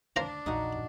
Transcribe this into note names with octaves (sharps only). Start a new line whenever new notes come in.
D2 D4 C5 F5 A#5
A#1 E2 D#4 F#4 F#5